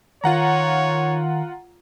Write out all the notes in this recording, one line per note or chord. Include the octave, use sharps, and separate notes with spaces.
D#3 F4 C#5 F#5 A#5